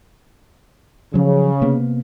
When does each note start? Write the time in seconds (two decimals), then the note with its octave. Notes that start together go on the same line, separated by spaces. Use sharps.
1.14 C#3 F3 F#3
1.62 C3 A#3 B3